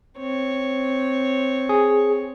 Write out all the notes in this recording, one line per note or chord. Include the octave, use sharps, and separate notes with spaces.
C4 C#5
G#4